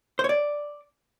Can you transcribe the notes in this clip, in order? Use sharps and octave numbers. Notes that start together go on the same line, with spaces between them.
C5
C#5
D5